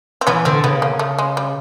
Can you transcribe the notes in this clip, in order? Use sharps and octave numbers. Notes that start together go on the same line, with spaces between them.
C4
E3 B3 C#4
D3 C4
C#3 B3
A#3
A3
G#3
G3